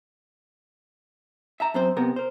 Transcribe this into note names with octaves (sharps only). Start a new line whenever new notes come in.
E5 A5 A#5
F#2 C4 C5
C3 B3 A#4
A#4 C5